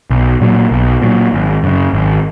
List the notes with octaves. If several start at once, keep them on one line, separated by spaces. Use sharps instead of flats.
B1
A#2 F#3
B1
A#2 F#3
G#1
F#2 C#3
G#1